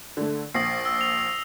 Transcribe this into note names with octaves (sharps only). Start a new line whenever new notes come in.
D3 A3
A#1 D#6 A#6 C7
E6
F7